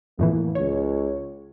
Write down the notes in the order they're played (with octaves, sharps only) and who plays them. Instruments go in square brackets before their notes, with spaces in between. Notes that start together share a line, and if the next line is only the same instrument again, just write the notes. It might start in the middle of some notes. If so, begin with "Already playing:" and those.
[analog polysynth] F2 A2 E3 [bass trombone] A#3
[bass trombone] C#2 [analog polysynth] C#5